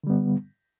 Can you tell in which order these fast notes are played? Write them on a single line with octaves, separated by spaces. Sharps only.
D3 G3 B3